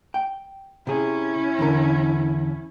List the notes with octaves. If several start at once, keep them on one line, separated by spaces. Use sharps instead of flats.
G5
C3 C#4 E4 G#4
E2 D3 A#4